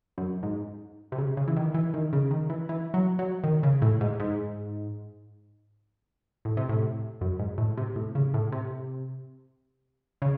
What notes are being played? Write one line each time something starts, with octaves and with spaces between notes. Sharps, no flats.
F#2
G#2
C3
C#3
C#3
E3
D#3
E3
D#3
C#3
D#3
E3
E3
F#3
F#3
D#3
C#3
A2
G#2
G#2
A2
C3
A2
F#2
G#2
A2
C3
A2
C#3
A2
C3
C#3